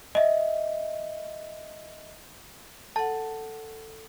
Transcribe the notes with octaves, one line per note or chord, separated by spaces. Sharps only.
D#5 E5
A4 F#5 A5